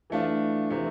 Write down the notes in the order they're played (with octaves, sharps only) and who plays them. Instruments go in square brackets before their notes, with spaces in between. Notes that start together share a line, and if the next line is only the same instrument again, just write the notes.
[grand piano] E3 A3 D4 F4
C3 E3 A3